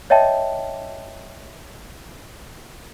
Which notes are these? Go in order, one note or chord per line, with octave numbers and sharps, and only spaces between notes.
C#5 D#5 E5 G5 A5